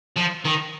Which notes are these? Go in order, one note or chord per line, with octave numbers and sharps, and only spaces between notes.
F3
D#3